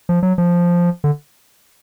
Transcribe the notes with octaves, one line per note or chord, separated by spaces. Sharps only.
F3
F#3
F3
D3